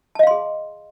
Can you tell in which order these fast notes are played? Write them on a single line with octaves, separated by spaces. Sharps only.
A5 D#5 F5 C6 G#4